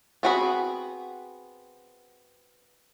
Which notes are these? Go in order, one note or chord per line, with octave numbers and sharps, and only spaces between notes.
B3 C4 F#4 G#4 B5